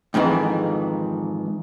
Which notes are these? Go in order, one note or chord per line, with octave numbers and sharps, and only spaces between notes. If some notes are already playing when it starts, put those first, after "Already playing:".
F2 G#2 D#3 E3